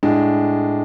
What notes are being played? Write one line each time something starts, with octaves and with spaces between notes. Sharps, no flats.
A2 G#3 D4